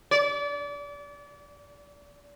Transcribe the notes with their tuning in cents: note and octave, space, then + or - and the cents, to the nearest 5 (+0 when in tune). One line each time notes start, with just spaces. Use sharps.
D5 -30